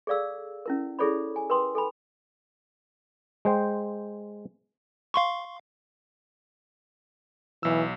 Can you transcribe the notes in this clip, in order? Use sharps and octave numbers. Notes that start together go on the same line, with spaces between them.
G#4 A4 D5 F5 E6
C#4 E4 A#4
E4 G#4 A4 C#5 D5 B5
G#5
A#4 B4 G5 C6 D#6
A4 G#5 B5
G#3 C5 G5
F5 C6 C#6
B1 E3 E6